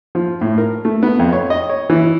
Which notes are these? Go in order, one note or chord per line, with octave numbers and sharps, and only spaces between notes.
F3
A2
A#4
A3
B3
F2
C#5
D#5
C#5
E3